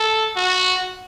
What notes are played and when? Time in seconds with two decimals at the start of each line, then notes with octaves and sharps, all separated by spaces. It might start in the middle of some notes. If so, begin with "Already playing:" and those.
Already playing: A4
0.36 F#4